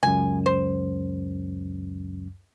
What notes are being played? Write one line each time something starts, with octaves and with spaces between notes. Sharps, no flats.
C#2 F#2 G#5
C5